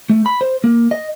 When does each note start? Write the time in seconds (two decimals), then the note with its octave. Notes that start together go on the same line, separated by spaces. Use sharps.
0.10 A3
0.26 B5
0.41 C5
0.64 A#3
0.91 D#5